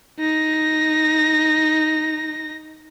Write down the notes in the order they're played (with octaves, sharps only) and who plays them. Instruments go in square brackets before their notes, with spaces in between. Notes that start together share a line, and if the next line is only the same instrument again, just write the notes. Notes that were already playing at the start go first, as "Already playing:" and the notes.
[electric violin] D#4 A#6